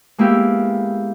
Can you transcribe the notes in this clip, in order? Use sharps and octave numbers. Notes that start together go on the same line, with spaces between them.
G#3 A#3 B3 E4 G4